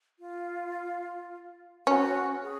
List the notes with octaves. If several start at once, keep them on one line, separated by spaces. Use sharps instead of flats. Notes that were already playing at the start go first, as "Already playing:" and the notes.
F4
C#4 F#4
G#4